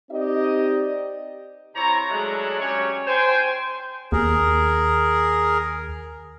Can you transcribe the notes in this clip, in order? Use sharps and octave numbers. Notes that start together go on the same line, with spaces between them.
C4 D#4 G4 D5 D#5
C3 E4 C#5 A#5
F#3 G#3 A3 D4 E4 D#5
F#3 C#4 G4 C#5
C5 G5 G#5
D#2 G#4 A#4